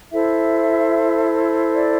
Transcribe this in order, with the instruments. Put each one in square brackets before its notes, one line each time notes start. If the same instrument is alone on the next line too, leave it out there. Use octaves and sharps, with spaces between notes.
[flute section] E4 A4 C5 E5
D5